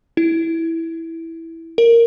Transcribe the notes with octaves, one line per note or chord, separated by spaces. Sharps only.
E4
A#4